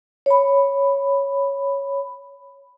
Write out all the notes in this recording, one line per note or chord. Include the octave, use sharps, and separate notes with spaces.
C#5 B5